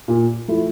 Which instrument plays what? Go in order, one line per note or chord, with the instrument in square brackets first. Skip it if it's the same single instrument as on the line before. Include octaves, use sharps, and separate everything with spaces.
[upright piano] A#2
F3 A3 E4